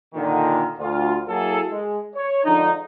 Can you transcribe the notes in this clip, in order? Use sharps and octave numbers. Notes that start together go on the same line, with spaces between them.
A#2 D3 D#3
D2 F4
F#3 A#3 E4 F#4 G#4 A4
G#3
C#5
D3 F3 G#3 D4 D#4